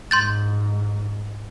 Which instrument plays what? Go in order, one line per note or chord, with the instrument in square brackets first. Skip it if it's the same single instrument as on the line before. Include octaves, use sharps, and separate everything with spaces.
[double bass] G#2 [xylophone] C6 G6 A6